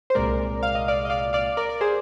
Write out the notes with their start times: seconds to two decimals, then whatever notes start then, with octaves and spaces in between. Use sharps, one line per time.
0.10 C5
0.15 C2 A#2 G#3 A#4 D5
0.63 F5
0.75 D#5
0.88 D5 F5
1.05 D#5
1.10 D5 F5
1.33 D5 F5
1.57 A#4 D5
1.69 D5
1.81 G#4 C5